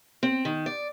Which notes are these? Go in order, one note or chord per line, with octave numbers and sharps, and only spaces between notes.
C4
D#3
D5